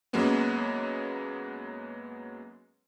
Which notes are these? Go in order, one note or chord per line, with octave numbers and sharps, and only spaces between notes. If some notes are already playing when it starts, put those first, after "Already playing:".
F#2 F#3 G#3 A#3 B3 C#4